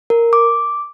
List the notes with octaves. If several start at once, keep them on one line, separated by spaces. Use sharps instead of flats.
A#4
D6